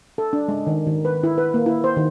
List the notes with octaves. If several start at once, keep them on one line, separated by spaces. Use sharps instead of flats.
A4
D4
G#3
D#3
D#3
B4
E4
B4
A#3
E4
C5
D#3